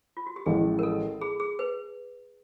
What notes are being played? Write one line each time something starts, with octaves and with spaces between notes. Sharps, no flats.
F4
F#4
G4
A1 A2 F3 G#3 G#4
A#4
A4
G#4
G#4
B4